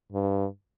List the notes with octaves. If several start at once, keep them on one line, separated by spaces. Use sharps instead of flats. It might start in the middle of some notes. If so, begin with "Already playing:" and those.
G2